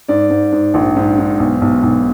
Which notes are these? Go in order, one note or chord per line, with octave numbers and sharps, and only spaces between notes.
G#2 D5
G#2
G#2
A#1
G#2
G#2
B1
B1
B1